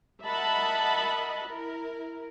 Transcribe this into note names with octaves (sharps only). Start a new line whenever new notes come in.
A#4 D#5 E5 F#5 A5 B5
E4 A#4